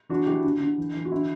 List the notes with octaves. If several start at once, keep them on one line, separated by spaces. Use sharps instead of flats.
E3 D4 F#4
E3 E4 G4
D3
D3
E3
E3
F#4
D3 E4